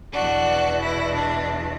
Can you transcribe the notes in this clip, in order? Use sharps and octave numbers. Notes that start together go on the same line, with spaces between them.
E2 B2 D4 F#4
E4
D4